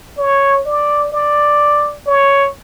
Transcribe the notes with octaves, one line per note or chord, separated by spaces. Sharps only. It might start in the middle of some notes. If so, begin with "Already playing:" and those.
C#5
D5
D5
C#5